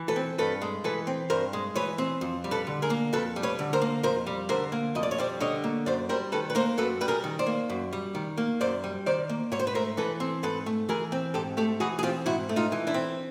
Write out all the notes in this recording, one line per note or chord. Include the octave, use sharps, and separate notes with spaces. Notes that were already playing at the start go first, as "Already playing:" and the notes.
Already playing: E3
A4 B4
C4
G2 A4 B4
G#3
E3 A4 B4
C4
G2 A#4 C5
G#3
E3 B4 C#5
C4
F2
G3
A4 B4
D3
G#4 A#4
A#3
F2 A4 B4
G3
B4 C#5
D3
A#4 C5
A#3
F2 A#4 C5
G3
D3 A#4 C5
A#3
F2 D#5
D5
C#5
G3 C5 D5
D3 C#5 D#5
A#3
F#2 C5 D5
G3 A#4 C5
D#3 A4 B4
B4
A#3 A#4 C5
F#2 A4 B4
G3 B4
G#4 A#4
D#3
C5 D5
A#3
F#2
G3
D#3
A#3
F#2 C5 D5
G3
D#3 C5 D5
A#3
G#2 C#5
C5
B4
A3 A#4 C5
E3 A4 B4
C4
G#2 A4 B4
A3
E3 G#4 A#4
C4
G#2 G4 A4
A3 G4 A4
E3 F#4 G#4
G#4
C4 F4 G4
G#2 E4 F#4
A3
D#4 F4
E3
D4 E4
C4